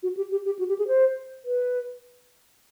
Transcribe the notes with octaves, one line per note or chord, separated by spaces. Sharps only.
F#4
G4
G4
G4
F#4
G4
G#4
C5
B4